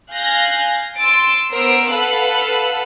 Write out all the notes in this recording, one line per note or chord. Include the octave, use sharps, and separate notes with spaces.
F5 G#5 F#6 G6 A#6
C6 E6 A6 D7
B3 A#4 C5 E6 C7 D7
A4 B4 F5 F#5 E6 F#6